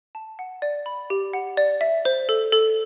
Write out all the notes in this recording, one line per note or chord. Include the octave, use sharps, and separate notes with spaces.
A5
F#5
D5
B5
G4
F#5
D5
E5
C5
A4
A4